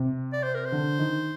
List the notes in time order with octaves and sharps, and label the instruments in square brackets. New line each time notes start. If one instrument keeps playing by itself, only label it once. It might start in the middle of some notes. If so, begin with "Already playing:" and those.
Already playing: [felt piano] C3
[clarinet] D5
C5
A#4
C5
[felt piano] D3
D#3